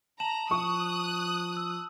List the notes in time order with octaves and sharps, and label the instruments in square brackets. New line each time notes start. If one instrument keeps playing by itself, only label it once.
[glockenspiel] A5 E7 F#7 [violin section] A#5
[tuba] F3 [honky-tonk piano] C#6 [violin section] D#6 F#6
[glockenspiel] E6